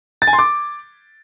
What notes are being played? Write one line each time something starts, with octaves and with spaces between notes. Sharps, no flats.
A6
G#5
C6
D6